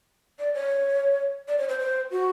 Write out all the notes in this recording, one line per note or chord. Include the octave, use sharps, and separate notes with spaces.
D5
C#5
D5
C#5
C5
C5
F#4